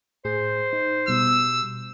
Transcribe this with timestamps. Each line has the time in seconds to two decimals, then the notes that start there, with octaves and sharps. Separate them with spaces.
0.25 A2 G#4 C5
0.73 D#4
1.08 B2 G3 E6